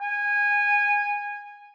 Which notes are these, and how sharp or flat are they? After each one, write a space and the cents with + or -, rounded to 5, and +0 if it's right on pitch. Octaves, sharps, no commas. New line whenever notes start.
G#5 -15